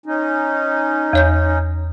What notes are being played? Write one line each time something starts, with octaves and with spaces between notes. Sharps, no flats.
C#4 D#4
E2 C#5 G6